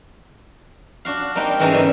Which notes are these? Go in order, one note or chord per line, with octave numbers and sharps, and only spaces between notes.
D4 F#4 F5
G3 A#3 C4 D#4 G4
G#2 E3 G#3 C#4 G#4 A#5
D3 G3 B3 C#4